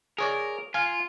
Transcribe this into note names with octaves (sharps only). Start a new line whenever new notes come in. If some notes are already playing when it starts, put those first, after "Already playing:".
G#4 A#4 C#5 D5
F4 F5 G#5